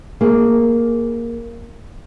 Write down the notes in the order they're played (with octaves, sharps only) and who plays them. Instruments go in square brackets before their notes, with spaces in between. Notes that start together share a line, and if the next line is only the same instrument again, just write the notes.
[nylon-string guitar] A#3 G#4